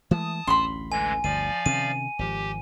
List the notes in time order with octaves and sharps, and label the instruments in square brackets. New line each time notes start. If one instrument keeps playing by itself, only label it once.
[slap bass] E3 G#3 A3 [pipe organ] A5 D#6
[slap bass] A1 D2 C#4 [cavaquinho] B5 C6
[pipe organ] D3 E3 G#3 [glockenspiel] G#5
[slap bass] G1 D2 [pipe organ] F3 D5 F5 [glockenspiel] D#7
[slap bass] C3 D#3 C#4 [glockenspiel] D#7
[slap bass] G#1 F3 [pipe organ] G4